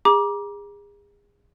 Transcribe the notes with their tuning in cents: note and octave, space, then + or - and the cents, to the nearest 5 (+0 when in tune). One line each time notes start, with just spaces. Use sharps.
G#4 -30 A#5 +35 D6 +0